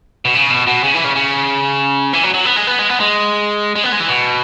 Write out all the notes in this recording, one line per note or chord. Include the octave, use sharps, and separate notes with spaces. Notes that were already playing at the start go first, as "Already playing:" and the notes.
B2
C#3
B2
B2
C#3
E3
C#3
C#3
E3
F#3
F#3
B3
G#3
B3
G#3
B3
G#3
G#3
B3
G#3
E3
B2